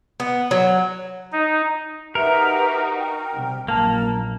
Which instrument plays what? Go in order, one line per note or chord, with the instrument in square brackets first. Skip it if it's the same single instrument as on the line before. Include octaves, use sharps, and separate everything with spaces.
[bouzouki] B3
F#3
[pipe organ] D#4
[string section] D#4 F#4 [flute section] G4 B4 E5 [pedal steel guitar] A#4
[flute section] G5
[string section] C3 G3
[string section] A#1 F#2 [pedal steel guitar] A#3 [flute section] A5